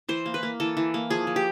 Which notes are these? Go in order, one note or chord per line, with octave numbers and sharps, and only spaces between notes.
E3 C5
A#3
B4
A#3
E3 A4
E3
A#3
F3 G#4
F3
G4